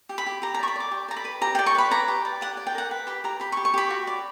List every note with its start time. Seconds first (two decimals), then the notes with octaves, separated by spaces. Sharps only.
0.09 G4
0.18 B5
0.26 G4
0.42 G4 A#5
0.54 A#5
0.59 D5 C#6
0.68 B5
0.76 D5 D6
0.91 G4
1.08 D5 A#5
1.17 B5
1.25 B4
1.41 G4 A#5
1.55 G5
1.59 D5
1.66 C#6
1.75 B4 B5
1.91 D5 A#5
2.08 G4
2.25 D5
2.41 G4 F#5
2.57 D5
2.67 G5
2.75 A#4 F#5
2.91 B4
3.07 G4 B5
3.24 G4 A#5
3.40 G4 B5
3.52 C#6
3.57 G4
3.65 C#6
3.74 G4 B5
3.90 F#4
4.07 D5